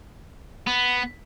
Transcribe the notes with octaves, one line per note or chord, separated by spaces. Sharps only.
B3